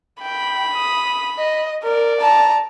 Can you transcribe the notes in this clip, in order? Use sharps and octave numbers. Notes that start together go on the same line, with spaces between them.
G5 B5
D#6
D#5
A#4 D5
A5 A#5